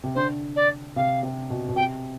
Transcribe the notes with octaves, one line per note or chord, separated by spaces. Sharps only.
C3
D3 C5
D5
C3 F5
C3
B2
B2
C3 G5